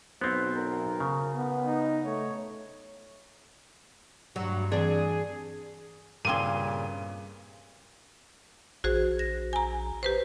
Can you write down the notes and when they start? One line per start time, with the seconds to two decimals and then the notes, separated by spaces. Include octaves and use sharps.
0.21 B1 B3 C4 C5
0.56 A#4
1.00 C#3
1.35 B3
1.66 D#4
2.05 A3 C#5
4.36 G2 F#3 F#5
4.72 E3 C4 D4 G#4
6.25 G2 A#2 C#3 A#3 C4 G#4 D#7 G7
8.84 A#1 F#4 G#4 C5
9.19 A#6
9.53 G#5 A#5
10.03 G4 B4 C5